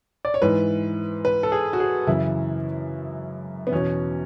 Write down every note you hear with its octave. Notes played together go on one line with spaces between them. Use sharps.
D5
C#5
G#2 E3 B4
B4
A4
G#4
F#4
G#4
F#2 C#3 E3 E4
B3
E2 B2 C#4